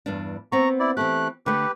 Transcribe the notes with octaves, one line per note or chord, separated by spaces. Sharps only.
E2 G2 D4
B3 C4 A#5 C#6
E4 D5
E3 A3 C4 G4 F#6
D3 A3 G4 B4